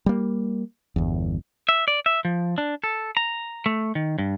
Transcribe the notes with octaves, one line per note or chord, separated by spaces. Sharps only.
G3 A#3
G1 E2
E5
D5
E5
F3
D4
A4
A#5
A3
D#3
G2